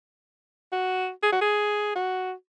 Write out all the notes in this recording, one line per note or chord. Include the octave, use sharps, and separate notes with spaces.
F#4
G#4
F#4
G#4
F#4